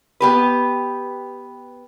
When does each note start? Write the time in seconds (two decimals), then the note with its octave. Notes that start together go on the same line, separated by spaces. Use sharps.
0.20 B3 G4 B4